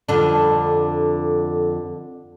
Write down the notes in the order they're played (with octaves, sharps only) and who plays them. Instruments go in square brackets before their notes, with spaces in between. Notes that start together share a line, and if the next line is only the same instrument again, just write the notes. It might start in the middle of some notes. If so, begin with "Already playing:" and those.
[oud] F2 D3 D4